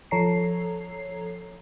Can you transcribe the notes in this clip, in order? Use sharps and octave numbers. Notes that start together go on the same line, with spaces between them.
F3 A4 C#5 A#5 C7